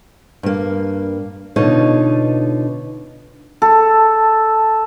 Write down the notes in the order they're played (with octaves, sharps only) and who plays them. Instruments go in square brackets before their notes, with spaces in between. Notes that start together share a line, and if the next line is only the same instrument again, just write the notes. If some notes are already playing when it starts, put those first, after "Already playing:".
[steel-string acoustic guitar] G2 A#3
B2 D3 D#4 F4 C#5
[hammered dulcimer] A4